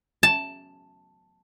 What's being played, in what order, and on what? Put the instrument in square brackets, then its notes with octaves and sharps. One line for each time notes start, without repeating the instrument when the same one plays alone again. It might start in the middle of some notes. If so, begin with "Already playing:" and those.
[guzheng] A5